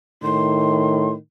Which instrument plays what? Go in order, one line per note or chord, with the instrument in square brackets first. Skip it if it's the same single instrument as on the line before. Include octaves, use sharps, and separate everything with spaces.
[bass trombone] A2 [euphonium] D#3 [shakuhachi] C6